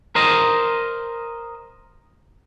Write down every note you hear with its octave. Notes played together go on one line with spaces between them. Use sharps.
A#4 C5 D#5